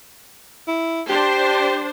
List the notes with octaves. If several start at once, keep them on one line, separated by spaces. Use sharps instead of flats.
E4
D4 G4 C5